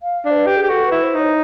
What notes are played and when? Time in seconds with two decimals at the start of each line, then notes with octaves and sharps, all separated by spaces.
0.02 F5
0.25 D4
0.31 C5
0.36 B4
0.46 G4
0.57 G#4
0.63 G4
0.69 F#4 A4
0.86 E4 B4
1.03 C5
1.14 D#4
1.20 C#5